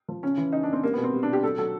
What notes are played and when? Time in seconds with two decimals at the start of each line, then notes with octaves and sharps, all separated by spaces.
0.09 F3
0.23 C#3 C#4
0.37 E3
0.52 C#3 D#4
0.63 D4
0.68 C#3 C4
0.83 G3 A#3
0.93 B3
0.98 B2
1.04 C4
1.13 G3
1.23 D4
1.28 B2
1.33 G4
1.43 F#3 A4
1.58 F#3 A4